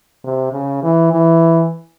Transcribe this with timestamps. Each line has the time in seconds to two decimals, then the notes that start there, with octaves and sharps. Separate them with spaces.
0.24 C3
0.53 C#3
0.83 E3
1.12 E3